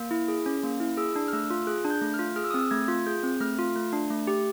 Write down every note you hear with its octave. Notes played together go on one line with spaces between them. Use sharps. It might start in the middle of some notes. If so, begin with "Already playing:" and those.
Already playing: A#3
E4
G#4
C#4
A#3
E4
G#4 E6
D4
F6
A3 E6
F4
G#4 F#6
D4
G6
A3
F6
F4
G#4 F6
E6
D#6
C4 E6
A3 G#6
F4
G#4 G6
C4
A3 F6
F4
A3
D4
A3
G4